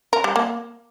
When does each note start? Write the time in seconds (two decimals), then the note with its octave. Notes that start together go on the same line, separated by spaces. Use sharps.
0.13 A#4
0.24 G3
0.36 A#3